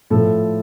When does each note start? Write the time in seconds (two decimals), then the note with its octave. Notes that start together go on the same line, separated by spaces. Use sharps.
0.10 A2 F3 A4